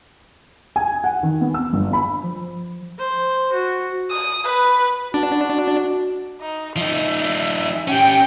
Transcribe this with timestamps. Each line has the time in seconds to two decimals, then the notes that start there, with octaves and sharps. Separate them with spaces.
0.76 G#5
1.04 F#5
1.23 D#3
1.41 B3
1.54 E6
1.73 G1
1.93 B5
2.24 F3
2.98 C5
3.52 F#4
4.11 D#6
4.45 B4
5.14 D4 F#4
6.41 D#4
6.77 F3 D#4 E5
7.88 C#4 G4 G5